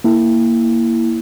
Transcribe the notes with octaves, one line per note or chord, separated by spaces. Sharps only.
A#3 E4